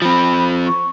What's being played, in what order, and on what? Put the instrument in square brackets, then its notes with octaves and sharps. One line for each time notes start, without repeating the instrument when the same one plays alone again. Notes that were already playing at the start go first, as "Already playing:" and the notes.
[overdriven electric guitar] F3 C4 [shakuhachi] B5
[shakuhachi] C#6